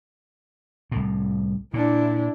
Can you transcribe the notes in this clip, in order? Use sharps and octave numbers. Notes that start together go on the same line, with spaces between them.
C2 A2
A#2 D4 E4